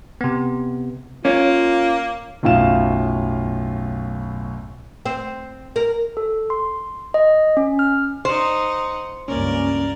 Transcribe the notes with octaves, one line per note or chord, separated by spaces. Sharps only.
C3 B3
A#3 C#4 F4
B1 F#2 A2 F4 F5 E7
C4
A#4
A4
C6
D#5
C#4
F6
D#4 C5 F#5
C#2 G2 A#3 C#4 A#4 D5